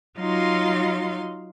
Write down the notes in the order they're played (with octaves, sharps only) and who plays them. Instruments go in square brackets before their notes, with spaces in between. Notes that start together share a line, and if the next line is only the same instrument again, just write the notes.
[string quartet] F#3 D#4 F4 F5 C6